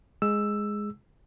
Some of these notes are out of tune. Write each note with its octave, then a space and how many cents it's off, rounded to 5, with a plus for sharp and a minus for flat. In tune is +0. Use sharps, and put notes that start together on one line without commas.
G#3 +0 E6 +5